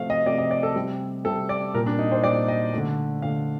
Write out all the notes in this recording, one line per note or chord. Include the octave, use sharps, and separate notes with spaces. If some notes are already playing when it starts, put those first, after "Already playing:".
Already playing: C3 F3 A3 F5
D#5
C3 F3 A3 D5
D#5
D5
A4
C3 G3
C3 G3 A4
D5
A#2 G3 A#4
D4
D#4
C5
A#2 G3 D5
D#5
D3 A3
D3 A3 F5